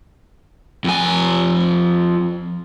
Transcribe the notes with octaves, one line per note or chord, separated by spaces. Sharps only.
F2 G#5